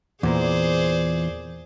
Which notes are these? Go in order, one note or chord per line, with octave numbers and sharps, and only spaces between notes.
E2 A#2 E3 G#4 C5 D5